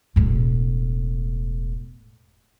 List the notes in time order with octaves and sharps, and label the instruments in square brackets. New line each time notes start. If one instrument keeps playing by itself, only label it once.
[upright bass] E1 A2